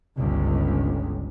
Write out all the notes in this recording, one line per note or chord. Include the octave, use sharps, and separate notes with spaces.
G1 C#2